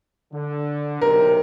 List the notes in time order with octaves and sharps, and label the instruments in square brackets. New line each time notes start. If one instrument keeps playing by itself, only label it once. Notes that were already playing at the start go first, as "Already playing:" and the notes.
[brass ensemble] D3
[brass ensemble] B1 C3 [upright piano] A#4